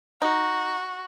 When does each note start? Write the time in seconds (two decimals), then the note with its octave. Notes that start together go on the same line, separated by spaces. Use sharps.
0.22 D#4 F#4